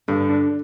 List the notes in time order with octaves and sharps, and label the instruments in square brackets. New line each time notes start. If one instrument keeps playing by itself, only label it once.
[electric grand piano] G2 [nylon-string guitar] D3
[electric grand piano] D4